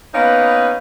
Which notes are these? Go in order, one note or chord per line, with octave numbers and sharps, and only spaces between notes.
A#3 B3 C#4 D#4 B4